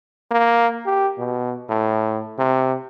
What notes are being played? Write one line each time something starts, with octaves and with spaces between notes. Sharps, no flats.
A#3
G4
B2
A2
C3